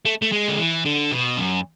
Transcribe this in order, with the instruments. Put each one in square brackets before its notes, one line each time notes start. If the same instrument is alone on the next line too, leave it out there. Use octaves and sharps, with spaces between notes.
[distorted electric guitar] A3
A3
G#3
D3
E3
D3
B2
F#2